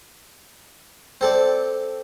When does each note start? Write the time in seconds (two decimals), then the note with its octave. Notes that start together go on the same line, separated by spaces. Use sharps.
1.21 C4 A4 D5